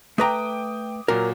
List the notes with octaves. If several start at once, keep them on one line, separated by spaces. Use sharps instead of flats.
A3 B4 G5 A#5 D6 D#6
A#2 F#3 A#4